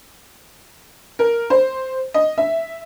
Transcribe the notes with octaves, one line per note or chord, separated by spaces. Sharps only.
A#4
C5
D#5
E5